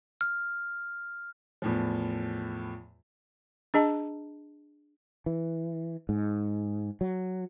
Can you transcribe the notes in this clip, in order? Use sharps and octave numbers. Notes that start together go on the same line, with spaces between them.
F6
E2 A2 F3
D4 G#4 D#5 A5
E3
G#2
F#3